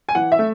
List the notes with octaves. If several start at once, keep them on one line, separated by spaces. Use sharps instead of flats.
G#5
E3 F#5
E5
A3